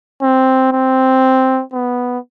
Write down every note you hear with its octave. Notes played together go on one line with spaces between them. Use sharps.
C4
C4
B3